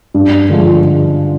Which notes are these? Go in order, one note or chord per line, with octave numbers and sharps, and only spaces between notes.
G2
D3 F3 G#3